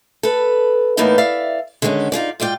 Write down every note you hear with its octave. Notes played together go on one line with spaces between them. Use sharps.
A4 B4
A2 E3 A#3 B3 D#4 A4
D5 E5 F5
D3 D#3 G#3 C4 C#4
D#4 F4 G#4 D5
G#2 F4 D5 G5